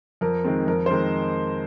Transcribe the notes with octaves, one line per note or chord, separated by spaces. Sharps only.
F2 A#4
D#3 G#3 C4
F2 A#4
C5
D#3 G#3 C4 A#4